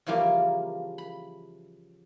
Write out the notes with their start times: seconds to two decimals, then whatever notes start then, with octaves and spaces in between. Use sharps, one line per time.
0.06 C#3 E3 F3 G3 A#3
0.98 B5